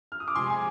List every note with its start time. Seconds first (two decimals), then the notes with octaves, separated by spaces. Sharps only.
0.12 F6
0.20 D#6
0.28 D6
0.35 C3 F3 G#3 G#5 C6
0.50 G#5